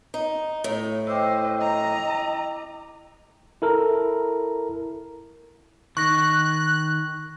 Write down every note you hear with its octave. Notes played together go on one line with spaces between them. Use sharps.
D#4
A2
C5 D#5 G5 D6 E6
D#5 A#5
E4 A4 A#4
D#3 C#6 F#6 A#6